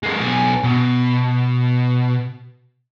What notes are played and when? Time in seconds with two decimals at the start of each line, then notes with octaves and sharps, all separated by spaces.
0.03 G#3 A#3
0.21 B1 G#5
0.64 B2